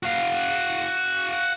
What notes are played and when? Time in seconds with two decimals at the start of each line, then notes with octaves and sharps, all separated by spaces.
0.03 F#4 F5